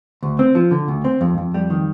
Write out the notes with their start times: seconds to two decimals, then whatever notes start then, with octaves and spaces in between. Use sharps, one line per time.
0.23 D2
0.39 C4
0.55 F3
0.71 D3
0.88 D2
1.05 C4
1.21 F2
1.38 F2
1.54 G3
1.70 D#3